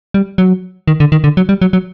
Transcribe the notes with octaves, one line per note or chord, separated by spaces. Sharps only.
G3
F#3
D#3
D3
D#3
D3
F#3
G3
F#3
F#3